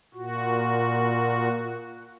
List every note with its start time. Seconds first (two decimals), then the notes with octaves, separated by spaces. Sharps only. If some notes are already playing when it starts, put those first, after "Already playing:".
0.14 A#2 F#4